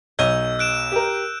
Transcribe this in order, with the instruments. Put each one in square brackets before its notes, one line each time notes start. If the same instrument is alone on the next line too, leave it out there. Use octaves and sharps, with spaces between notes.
[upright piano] B1 G7 [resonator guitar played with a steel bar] C#5 D#5 [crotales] E6 G6
[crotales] F#6 D7 E7
[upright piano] G4 A#4